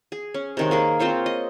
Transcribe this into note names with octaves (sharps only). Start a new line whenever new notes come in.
G#4
C#4
C3 D#3 G#3
A#3 G#4 A#4
C4 F4 C5 C#5
D#5